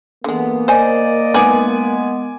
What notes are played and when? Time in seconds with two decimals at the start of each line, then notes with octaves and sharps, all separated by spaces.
0.24 D3 E3 G#3 A#3 B3
0.68 C5 D5 D#5 G#5
1.34 G#3 B3 D#4 B4 D5 G#5 D6